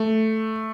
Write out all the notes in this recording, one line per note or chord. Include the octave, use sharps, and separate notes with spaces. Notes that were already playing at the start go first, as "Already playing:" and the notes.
Already playing: A3